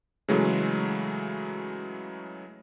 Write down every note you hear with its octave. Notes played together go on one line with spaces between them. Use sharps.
C#3 E3 F#3 G#3 A3